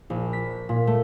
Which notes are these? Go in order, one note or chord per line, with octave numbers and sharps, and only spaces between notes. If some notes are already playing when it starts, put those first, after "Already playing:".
A#1
B6
A#2
A3